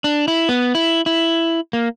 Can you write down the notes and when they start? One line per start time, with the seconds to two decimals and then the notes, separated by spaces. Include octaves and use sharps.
0.04 D4
0.28 E4
0.49 B3
0.75 E4
1.06 E4
1.73 A#3